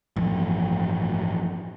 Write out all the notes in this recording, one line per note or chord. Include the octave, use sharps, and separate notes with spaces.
A1 G2 F3